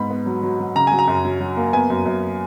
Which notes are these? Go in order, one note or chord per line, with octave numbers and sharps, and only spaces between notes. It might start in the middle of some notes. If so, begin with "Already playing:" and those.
Already playing: G#2 B3 B5
B3
F#3
F#3
F#3
C#3 A#5
F#3 G#5
A#5
F#2
F#3
F#3
A#3
B3 G#5
F#2
F#2